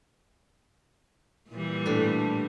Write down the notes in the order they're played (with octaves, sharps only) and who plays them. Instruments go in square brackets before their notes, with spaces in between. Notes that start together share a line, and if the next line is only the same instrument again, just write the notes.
[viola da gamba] A#2 E3 G3
[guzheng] A2 A3 D4